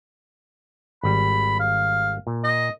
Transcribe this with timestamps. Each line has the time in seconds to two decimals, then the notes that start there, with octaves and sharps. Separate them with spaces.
1.03 G#1 G3 B5
1.60 F5
2.27 A#2
2.44 D#5